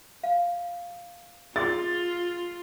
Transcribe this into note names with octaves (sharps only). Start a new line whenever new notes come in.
F5
F4 G#4 C6 D6 A6